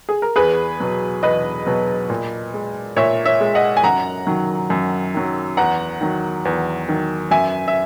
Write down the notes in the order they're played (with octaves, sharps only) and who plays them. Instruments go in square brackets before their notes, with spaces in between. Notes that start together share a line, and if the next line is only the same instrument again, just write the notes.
[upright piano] G#4
A#4
E2 G#4 B4
B2 F#3
E2 B4 D#5
B2 F#3
A#2
G#3
A#2 C#5 E5
C#5 E5
G#3
D#5 F#5
G#5
F#2 F#5 A#5
D#3 F#3
F#2
D#3 F#3
E2 F#5 A#5
D#3 F#3
E2
D#3 F#3
F#2 E5 G#5
E5